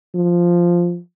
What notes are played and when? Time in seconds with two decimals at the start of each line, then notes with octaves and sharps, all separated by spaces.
0.15 F3